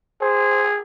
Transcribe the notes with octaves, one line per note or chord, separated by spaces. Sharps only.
G#4 C5